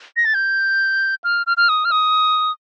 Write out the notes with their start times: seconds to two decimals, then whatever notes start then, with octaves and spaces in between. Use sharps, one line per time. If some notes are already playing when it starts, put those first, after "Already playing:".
0.17 A#6
0.25 A6
0.35 G6
1.24 F6
1.47 F6
1.57 F6
1.69 D#6
1.85 F6
1.91 D#6